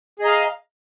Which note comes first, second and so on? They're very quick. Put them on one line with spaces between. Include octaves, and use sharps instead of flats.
G#4 D#5 A#5 F5